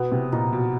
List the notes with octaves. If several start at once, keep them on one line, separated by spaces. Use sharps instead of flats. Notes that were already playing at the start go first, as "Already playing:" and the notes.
Already playing: B2 B3
C3
A#2 D#4
B2